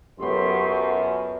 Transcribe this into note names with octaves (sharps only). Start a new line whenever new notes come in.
F#2 B3 F4 G4 A4 C6 C#6